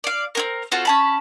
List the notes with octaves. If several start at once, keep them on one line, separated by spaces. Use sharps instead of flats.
D5 F5
C4 C#4 A#4
C4 F4 F#4 A4
C#4 A5 B5